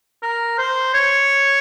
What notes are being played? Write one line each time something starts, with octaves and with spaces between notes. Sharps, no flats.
A#4
C5
C#5